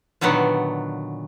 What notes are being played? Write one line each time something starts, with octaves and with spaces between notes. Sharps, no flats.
A#2 D3 D#3 F#3 B3